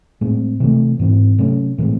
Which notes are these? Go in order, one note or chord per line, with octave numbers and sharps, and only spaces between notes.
A2 G#3 C4
C3 E3 A3
G#2 E3 C4
C3 F#3 A3 C#4
A2 E3 G#3 C4